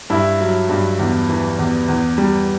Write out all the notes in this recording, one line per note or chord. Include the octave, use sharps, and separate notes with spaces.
G2 E4
F#3
G2
E2
E3
E2
E2
G3